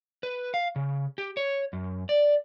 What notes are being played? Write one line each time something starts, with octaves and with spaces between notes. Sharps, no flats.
B4
F5
C#3
G4
C#5
F#2
D5